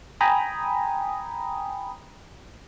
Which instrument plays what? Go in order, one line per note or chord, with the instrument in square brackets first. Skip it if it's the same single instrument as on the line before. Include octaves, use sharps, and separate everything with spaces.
[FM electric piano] G5 G#5 A#5 B5 D#6